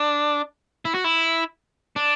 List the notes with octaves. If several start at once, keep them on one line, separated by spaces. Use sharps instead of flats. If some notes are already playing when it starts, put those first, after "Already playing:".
Already playing: D4
E4
F#4
E4
D4